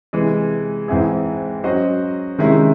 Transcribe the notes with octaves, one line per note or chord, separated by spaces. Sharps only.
C3 E3 G#3
G#2 E3 C4 E4 G#4
F#3 C#4 F#4 C5 D#5
C3 D#3 G#3 C#4 E4